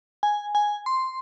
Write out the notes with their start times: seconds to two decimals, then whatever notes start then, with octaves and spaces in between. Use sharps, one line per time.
0.23 G#5
0.55 G#5
0.86 C6